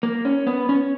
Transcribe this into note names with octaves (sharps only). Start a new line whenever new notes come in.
A#3
C#4
B3
C#4